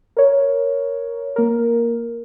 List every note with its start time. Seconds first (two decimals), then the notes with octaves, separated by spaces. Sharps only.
0.17 A#4 C#5
1.36 A#3 A#4